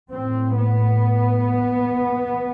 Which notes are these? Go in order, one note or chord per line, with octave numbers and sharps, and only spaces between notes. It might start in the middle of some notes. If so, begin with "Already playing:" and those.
A2 C4
B3